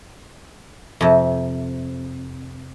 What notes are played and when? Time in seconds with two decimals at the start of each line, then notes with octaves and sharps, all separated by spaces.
1.01 F2 C3